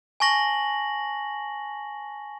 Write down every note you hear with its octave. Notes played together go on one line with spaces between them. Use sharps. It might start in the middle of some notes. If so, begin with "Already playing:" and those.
G#5 A5 C#6 A#6 F#7